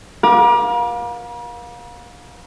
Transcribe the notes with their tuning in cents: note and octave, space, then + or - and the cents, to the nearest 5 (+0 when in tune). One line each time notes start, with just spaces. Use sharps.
A#4 +45 F5 +30 D6 +15